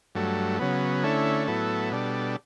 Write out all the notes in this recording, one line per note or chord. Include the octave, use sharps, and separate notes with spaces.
G2 F#3 A3
C#3 F#3 B3
D3 A3 C#4 E4
A2 F#3 B3 E4 A4
B2 G3 D4 A4